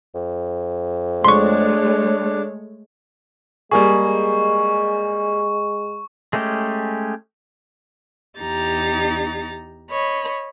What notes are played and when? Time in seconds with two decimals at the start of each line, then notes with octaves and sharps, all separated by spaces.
0.15 F2
1.25 G#3 A3 D4 C#5 C6 C#6
3.71 G3 G#3 A#3 G#4 C#6
6.33 G#3 A3 C#4 G4
8.40 E2 D#4 G4 A#5 A6
9.90 C#5 D#5 B5